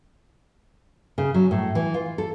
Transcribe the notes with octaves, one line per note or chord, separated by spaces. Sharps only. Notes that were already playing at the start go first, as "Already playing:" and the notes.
C#3
F#3
A2
E3
F4
A4